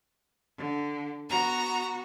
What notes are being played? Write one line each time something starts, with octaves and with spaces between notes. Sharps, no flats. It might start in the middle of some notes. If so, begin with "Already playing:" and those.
D3
B3 F#4 A#5